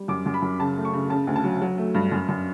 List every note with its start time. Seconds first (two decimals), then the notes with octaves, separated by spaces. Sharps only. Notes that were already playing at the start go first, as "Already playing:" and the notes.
Already playing: G3
0.08 F#2 D6
0.26 F#2
0.34 B5
0.42 F#2
0.60 C#3 A5
0.77 A3
0.85 C#6
0.93 C#3
1.10 C#3 A5
1.27 D2
1.36 A5
1.44 F#3
1.62 F#3
1.78 A3
1.95 G2
2.12 F#2
2.29 F#2